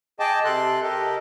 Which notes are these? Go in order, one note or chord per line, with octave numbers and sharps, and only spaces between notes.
G#4 D#5 G5 A5 D6
C3 A4 C6 F#6
G4 A4 A#4 D#5